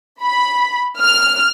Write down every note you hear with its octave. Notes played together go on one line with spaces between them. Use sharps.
B5
F6